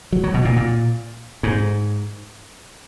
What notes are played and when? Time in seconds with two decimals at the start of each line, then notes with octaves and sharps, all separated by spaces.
0.12 F#3
0.24 F#3
0.34 B2
0.45 A#2
0.56 A#2
1.43 G#2